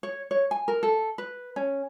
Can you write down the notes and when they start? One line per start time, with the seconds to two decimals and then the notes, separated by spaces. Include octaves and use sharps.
0.03 C#5
0.31 C#5
0.51 G#5
0.68 A#4
0.83 A4
1.18 B4
1.56 C#4